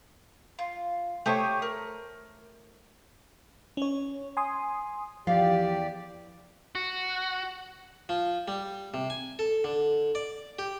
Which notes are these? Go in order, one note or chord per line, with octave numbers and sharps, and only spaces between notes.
F4
A3 G4 C5 C#5 C#6 D#6
A#4
C#4 C#5
G#5 C6 D#6
E2 F3 G4 D5 F5
F#4
F3
G3
C3
G#5
A4
D3
D5
G4